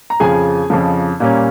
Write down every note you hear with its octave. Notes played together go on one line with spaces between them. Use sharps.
A#5
F2 C#3 F3 G#4 G#5
F2 C#3 F3
A#2 G3 A#3 C#4